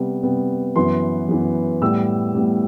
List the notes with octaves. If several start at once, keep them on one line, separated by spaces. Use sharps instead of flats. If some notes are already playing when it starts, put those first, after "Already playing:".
Already playing: C3 G3 B3
C3 G3 B3
F#2 E3 B3 C6
F#2 E3 B3
A2 G3 B3 E6
A2 G3 B3